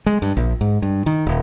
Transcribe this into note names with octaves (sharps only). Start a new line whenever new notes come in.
G#3
G2
A#1
G#2
G2
D#3
D#1